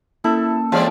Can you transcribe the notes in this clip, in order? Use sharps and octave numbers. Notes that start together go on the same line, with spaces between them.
A#3 C#4 E4 A4
E3 F3 G#3 A3 C4 D5